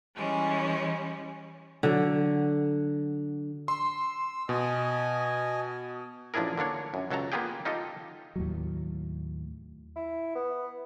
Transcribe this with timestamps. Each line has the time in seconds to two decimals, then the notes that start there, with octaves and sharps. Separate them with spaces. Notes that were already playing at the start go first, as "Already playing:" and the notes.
0.16 E3 G3 G#3 C#4
1.83 D3 F#3
3.68 C6 E6
4.49 B2 D#5 G#5
6.34 A1 F3 D4 E4 G#4 A#4
6.58 D3 A#3 D4 C#5
6.94 F#2
7.10 C#2 F#3 A4 A5 A#5
7.32 A#3 B3 F4 G4 G#4 G5
7.65 D#4 F4 G4 A4 D#5
8.36 D#2 A2 F#3
9.96 E4
10.35 B3